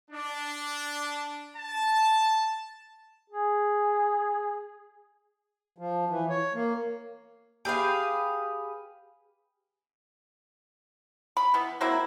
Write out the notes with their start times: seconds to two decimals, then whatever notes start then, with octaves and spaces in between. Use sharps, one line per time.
0.10 D4
1.57 A5
3.30 G#4
5.78 F3
6.10 E3
6.30 C#5
6.54 A#3
7.65 G4 G#4 B4 F5
11.37 B5
11.54 E3 B3
11.81 F#3 A#3 C4 E4